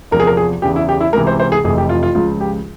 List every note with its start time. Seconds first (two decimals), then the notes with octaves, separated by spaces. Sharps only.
0.11 E2 C3 F3 A#4
0.20 G#4
0.27 A#4
0.37 G#4
0.62 E2 C#3 E3 G4
0.76 E4
0.89 G4
1.01 E4
1.13 C#2 C3 E3 A#4
1.27 C5
1.40 C5
1.52 G#4
1.64 F1 F2 C3 E3 G#4
1.78 G4
1.89 F4
2.03 F4
2.15 C#2 C#3 F3 F4
2.41 G4